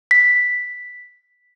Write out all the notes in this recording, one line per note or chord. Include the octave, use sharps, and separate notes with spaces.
B6